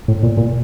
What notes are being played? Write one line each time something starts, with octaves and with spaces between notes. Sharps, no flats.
A2
A#2
A#2